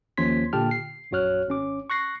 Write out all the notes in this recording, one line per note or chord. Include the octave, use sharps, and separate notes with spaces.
D#2 F3 C#4 C6 G#6 B6
A#2 D3 G4 G5 A5 F6
C7
A#1 F#2 F#4 C#5 F6 F#6
G#1 C#4 D6
C#6 F#6 A#6 C7